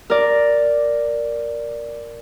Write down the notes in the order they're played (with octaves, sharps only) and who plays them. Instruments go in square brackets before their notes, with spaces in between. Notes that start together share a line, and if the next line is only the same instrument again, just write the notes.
[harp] A#4 D5